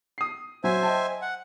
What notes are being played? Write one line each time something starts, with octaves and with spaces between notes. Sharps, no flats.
D#6 C7
F#3 C5 E5 G#5
D#5 G5 A5
F#5